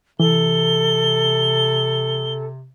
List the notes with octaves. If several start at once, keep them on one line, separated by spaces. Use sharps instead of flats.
C3 E3 A4 G7